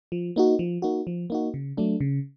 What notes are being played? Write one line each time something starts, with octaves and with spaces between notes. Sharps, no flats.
F3
A#3 D#4 F#4
F3
A#3 D#4 F#4
F3
A#3 D#4 F#4
C#3
F#3 A3 D4
C#3